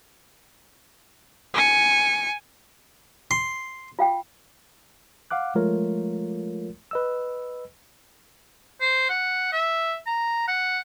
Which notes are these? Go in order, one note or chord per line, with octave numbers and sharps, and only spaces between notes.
G#5 C#7
C6
F4 F5 G5
F5 F#5 D6 F#6
F3 G#3 A3 F4 A#4 C#5
B4 D#5 E6
C5
F#5
E5
A#5
F#5